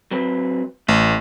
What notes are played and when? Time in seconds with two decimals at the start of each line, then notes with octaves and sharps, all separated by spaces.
0.11 F#3 C4 B4
0.88 A1 A3 C6